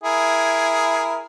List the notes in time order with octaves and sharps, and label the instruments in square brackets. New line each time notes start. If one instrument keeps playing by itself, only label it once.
[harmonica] E4 G#4 A#4